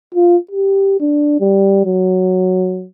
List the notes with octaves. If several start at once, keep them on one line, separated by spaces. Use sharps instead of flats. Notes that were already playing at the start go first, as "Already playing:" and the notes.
F4
G4
D4
G3
F#3